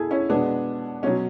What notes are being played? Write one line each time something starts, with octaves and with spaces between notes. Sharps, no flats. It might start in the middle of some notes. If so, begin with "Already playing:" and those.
Already playing: B2 E4 G#4 A4
C#4 E4
B2 G#3 B3 D4
B2 F#3 C#4